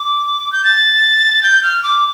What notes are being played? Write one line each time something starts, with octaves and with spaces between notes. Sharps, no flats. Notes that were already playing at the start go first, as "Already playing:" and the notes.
Already playing: D6
G6
A6
G6
F6
D6